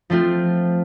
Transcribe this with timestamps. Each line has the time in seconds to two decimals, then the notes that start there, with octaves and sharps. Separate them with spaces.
0.10 F3 A3 C4 F4